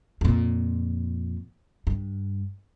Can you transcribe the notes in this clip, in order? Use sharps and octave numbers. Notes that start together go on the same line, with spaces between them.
F2 A#2
G2